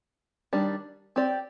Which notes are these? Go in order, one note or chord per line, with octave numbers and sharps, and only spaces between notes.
D#3 G3 D4
C4 G4 D5